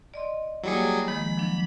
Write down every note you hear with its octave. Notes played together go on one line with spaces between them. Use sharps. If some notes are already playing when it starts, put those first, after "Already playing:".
D5 D#5 C6
F#3 G3 A#3 E4 G#4
D#3 F3 G#3 B5
F3 F#3 D4